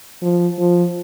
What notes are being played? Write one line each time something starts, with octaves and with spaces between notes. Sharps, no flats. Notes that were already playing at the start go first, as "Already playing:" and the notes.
F3
F3